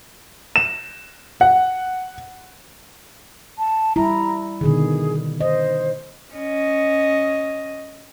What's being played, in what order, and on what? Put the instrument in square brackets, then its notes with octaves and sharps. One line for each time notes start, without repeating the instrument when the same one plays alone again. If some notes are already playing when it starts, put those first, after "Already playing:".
[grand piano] E7
F#5
[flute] A5
[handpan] G3 E4 [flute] A#5
[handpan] B2 D3 D#3 [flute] G#4
[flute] C5 [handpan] D#5
[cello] C#4 D#5